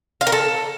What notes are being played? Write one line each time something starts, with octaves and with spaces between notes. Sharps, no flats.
F5
A#4
A4